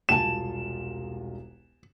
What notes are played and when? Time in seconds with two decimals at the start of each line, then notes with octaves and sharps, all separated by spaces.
0.09 E1 C2 F4 G#5 A5 E7